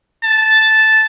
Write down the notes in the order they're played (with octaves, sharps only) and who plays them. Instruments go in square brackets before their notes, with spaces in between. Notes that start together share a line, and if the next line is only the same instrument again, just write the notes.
[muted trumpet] A5